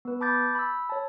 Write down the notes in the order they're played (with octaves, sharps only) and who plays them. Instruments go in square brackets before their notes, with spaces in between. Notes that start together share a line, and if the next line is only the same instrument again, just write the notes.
[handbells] B3 B4
A5 B5 D6 F#6 G6 A6
B5 E6
C#5 A5